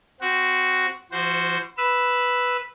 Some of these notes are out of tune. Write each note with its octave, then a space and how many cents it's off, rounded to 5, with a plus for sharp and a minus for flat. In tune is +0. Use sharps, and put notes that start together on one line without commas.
C4 -10 F#4 +0
F3 -40 F#4 +0 C5 +0
B4 +0 E6 +0